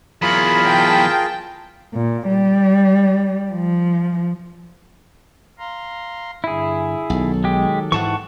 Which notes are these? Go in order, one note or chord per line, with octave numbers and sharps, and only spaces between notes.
E2 F#3 F4 G#4 A#4 B5
G5 A5
A#2
G3
F3
F5 A#5 C6
G2 D3 E4 G#4
B1 D#3 F#3 A4
G#3 G4
G#2 E3 F#5 A5 C#6